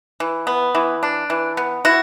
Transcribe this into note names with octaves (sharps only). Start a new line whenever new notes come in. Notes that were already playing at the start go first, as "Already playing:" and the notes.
E3
B3
E3
D4
E3
B3
E4 F#4